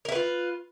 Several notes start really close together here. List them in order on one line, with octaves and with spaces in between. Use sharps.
A#4 E4 B4 F4